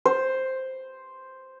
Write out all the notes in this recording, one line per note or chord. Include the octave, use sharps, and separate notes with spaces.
C5